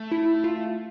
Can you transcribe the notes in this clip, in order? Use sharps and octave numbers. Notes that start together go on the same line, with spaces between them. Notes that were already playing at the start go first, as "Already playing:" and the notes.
Already playing: A3
E4
F4